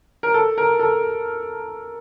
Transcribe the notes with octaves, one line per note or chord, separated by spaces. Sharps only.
A#4
A4
A#4
A4